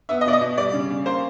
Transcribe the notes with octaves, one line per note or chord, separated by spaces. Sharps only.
B3 E5
D#5
B2 D5
D#5
B2
G3 D5
C#3
C#3
A#3 C5